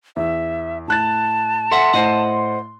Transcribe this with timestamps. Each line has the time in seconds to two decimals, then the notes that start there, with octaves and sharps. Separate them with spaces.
0.16 E2 E5
0.88 A2 A5 F#6 A6
1.71 A4 E5 F#5 C6
1.93 A2 C5 D#5 F#5